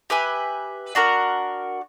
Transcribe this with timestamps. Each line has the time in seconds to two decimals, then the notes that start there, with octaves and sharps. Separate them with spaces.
0.10 G4 B4 E5 G#5
0.95 D4 F#4 A#4